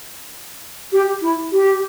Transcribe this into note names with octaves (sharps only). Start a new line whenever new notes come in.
G4
E4
G4